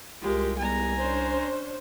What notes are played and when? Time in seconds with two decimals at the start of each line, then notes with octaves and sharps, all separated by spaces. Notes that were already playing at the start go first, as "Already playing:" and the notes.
0.21 C2 G#3 F4 G4 A#4
0.58 G3 G#3 B3 G#5 A#5
0.98 C#4 D4 C5